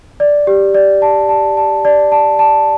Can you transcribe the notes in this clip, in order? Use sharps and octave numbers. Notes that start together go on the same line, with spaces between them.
D5
G4
D5
A5
A5
A5
D5
A5
A5